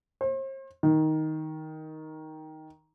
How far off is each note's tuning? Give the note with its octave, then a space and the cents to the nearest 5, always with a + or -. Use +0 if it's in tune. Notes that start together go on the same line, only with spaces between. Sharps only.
C5 +40
D#3 +10